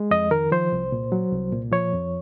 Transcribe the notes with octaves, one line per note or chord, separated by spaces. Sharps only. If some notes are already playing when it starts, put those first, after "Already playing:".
Already playing: G#3
F2 D#5
D#3 A#4
F3 C5
C2
A#2
F#3
C2
A#2
F3 C#5
F2